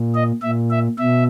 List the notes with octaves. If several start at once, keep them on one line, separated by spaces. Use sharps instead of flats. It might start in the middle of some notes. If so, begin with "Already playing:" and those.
Already playing: A#2
D#5
A#2 E5
E5
B2 E5